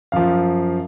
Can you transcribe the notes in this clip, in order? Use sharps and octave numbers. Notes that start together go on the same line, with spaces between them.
F#2 F3 F5